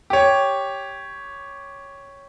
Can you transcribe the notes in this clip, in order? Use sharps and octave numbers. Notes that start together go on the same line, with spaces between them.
G4 C#5